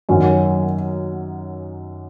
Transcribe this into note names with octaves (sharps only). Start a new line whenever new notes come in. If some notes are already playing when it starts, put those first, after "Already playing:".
F#2 D#3 F#3 C#4